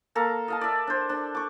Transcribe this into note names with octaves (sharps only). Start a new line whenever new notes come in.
A#3 A4 F5 A#5
D#5 F5 A5
D5 E5
D4 C5
D4
C#6 D6